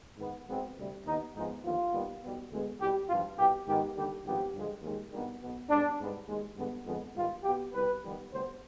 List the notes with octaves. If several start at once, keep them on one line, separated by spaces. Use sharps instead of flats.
G#2 D#3 B3
B1 B2 G#3 B3 C4
D2 C3 G3
D#2 D#3 B3 D#4
G#2 F3 G#3 B3 D#4
D#2 D3 F3 B3 F4
D#2 D#3 G3 B3
B1 B2 G3 B3
D2 D3 G#3 B3
C2 B2 G3 G4
G#1 G2 F3 F4
C2 B2 B3 G4
G#2 D#3 G#3 B3 G4
D#2 D3 G3 G4
G#1 G2 F3 B3 G4
G2 D3 F3 G#3
D#2 D#3 G#3
G#1 G2 D#3 G3 B3
B1 B2 B3
G#2 G3 B3 D4
G#2 G3 B3
D#2 D#3 G#3
G2 D3 G#3 B3
F2 D3 G#3 B3
G#2 D#3 G3 B3 F4
B1 B2 B3 G4
C2 B2 G3 B4
F2 D#3 G3 B3
D2 C3 G3 B3 C5